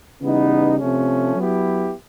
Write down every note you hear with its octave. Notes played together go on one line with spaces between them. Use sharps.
C#3 E3 G3 B3 D#4
C3 F3 A3 C#4
F#3 B3 E4 G4